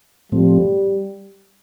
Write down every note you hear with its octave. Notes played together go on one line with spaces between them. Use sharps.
A2 F3 G3 A3 C4